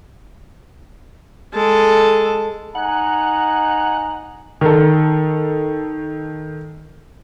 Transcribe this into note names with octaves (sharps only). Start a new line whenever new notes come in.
G#3 A4
D#4 F#5 G#5 A#5
D#3 A4